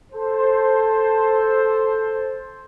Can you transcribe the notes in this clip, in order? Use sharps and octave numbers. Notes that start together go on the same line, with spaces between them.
A4 C5